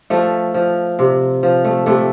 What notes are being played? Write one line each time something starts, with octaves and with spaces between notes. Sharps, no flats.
F3 A3
F3
C3
F3
A3
C3 A3